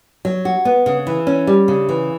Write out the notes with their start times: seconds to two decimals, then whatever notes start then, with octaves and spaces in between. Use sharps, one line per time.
0.25 F#3
0.45 F#4
0.65 B3
0.86 C#3
1.07 E3
1.27 C#4
1.47 G3
1.68 C#3
1.89 E3